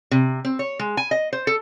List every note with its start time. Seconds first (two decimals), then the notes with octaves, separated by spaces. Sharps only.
0.11 C3
0.45 C4
0.59 C#5
0.79 G#3
0.97 G#5
1.11 D#5
1.33 C5
1.47 A4